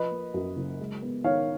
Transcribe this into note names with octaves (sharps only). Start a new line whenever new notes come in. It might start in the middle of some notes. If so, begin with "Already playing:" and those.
Already playing: F3 B4 D#5
A#3
F#2
F#1
G#3
B3
D#3 C#5 F5